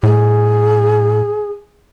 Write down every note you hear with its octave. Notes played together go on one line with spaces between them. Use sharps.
A2 G#4